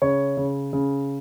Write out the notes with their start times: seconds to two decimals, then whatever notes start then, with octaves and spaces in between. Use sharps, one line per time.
0.02 C#3 C#5
0.37 C#3
0.73 C#3